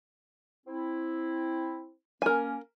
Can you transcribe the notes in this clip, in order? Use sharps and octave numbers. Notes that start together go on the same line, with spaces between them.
C4 E4
A#3 C#4 A#4 G#5